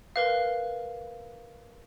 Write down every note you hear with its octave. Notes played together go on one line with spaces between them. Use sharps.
A#4 B4 F5